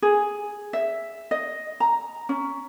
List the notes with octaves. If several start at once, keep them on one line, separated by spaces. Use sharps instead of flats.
G#4
E5
D#5
A#5
C#4